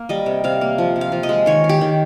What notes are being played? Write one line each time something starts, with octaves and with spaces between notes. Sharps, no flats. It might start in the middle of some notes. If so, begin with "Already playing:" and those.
Already playing: A#3
G3 D#5
C3
C3 F5
A#3
F3
C3
F5
F3
D#5
G#3
D#3 C#5
D#3
G4
D#3